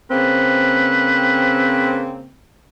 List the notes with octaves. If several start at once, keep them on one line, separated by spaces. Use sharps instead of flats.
C#3 A#3 C4 B4